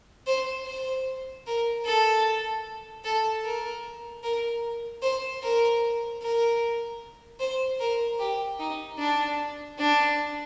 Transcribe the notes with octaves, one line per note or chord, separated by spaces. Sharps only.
C5
C5
A#4
A4
A4
A#4
A#4
C5
A#4
A#4
C5
A#4
G4
D#4
D4
D4